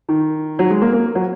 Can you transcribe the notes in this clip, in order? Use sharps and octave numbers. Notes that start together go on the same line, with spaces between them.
D#3
F#3
G#3
A#3
A#3
F#3